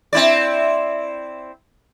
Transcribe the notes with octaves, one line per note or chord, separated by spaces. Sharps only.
C4 E4 D5